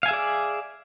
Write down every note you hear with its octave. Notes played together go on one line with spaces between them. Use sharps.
G#4 D5 E5 F5 G#5